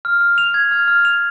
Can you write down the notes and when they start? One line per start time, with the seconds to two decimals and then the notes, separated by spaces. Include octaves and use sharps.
0.05 F6
0.21 F6
0.38 F7
0.54 G#6
0.71 F6
0.88 F6
1.05 F7